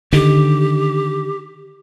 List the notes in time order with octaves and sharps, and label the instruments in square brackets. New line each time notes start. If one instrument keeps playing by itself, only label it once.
[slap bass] D3 D#3 [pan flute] G4